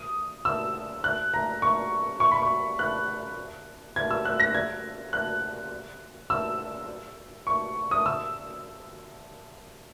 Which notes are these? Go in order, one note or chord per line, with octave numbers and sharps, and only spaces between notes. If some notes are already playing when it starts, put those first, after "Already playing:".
Already playing: D#6
E6
F#6
A#5
C#6
C#6
B5
C#6
F#6
G#6
E6
F#6
A#6
G#6
F#6
E6
C#6
D#6
E6